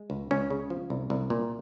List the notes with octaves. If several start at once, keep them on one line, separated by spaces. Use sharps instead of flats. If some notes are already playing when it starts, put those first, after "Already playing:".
Already playing: G#3
C#2
C#2 C#4
C#3
F3
C2
C2
A#2